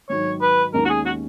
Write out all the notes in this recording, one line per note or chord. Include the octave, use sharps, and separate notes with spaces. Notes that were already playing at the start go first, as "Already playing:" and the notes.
G#2 D#3 F#3 C#5
B4
D#2 D#3 G#3 C#4 A#4
F#4
G#4
F#4